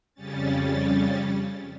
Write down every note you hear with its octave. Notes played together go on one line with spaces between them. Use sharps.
F2 C#3 G3 C#4 A6